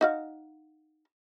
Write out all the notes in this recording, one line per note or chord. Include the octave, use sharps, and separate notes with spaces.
D#4 F#4 F5